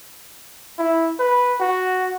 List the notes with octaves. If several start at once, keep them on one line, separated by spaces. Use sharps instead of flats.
E4
B4
F#4